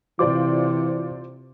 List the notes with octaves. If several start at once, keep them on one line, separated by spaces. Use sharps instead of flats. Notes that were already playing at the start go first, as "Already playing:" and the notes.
C3 E3 F4 C5 D5 D6